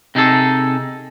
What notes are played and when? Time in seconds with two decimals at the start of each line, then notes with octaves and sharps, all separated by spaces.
0.15 C3 D#4 G#4 A4